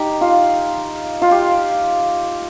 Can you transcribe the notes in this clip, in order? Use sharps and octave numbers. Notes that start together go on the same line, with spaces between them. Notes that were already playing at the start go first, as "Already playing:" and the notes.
Already playing: D#4 G4
F4
F4
G4